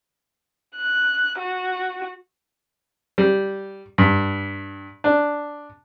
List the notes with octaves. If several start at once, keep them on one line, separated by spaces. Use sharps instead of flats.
F#6
F#4
G3
G2
D4